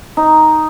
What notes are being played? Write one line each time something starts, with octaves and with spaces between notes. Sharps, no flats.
D#4